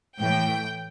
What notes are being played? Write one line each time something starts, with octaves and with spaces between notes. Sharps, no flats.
A2 E3 G5